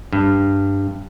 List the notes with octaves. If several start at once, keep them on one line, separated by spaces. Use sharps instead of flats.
G2